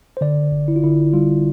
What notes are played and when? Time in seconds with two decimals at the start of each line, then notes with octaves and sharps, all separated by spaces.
0.17 C5
0.21 D3 D5
0.52 G1
0.68 E4
0.76 F4
0.83 D3 E4
1.13 G3 F4